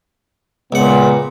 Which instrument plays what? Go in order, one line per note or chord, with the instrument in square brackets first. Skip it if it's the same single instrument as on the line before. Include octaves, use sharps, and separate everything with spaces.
[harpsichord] C#2 F#5 [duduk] A#2 [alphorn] B3